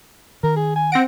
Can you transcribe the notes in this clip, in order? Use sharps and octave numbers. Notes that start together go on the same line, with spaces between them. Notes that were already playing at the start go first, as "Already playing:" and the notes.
D#3 A#4
G#4
G#5
C4 F#5 A#6 D7